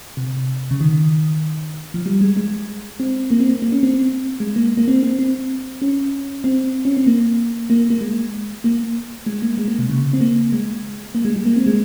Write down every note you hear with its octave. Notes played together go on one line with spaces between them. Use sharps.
C3
C#3
D#3
F3
G3
G#3
G#3
C4
A#3
C4
A#3
A#3
C#4
C4
C4
G#3
A#3
A#3
C4
C4
C4
C#4
C4
C#4
C4
A#3
A#3
A#3
G#3
A#3
G#3
A#3
G#3
A#3
C3
C#3
C4
A#3
G#3
A#3
G#3
G3
G#3
A#3
C4
G#3